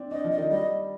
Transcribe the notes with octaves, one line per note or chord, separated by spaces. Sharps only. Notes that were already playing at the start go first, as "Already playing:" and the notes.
Already playing: C4 D4
D4 D#5
F3
D#5
D#3
G3 D#5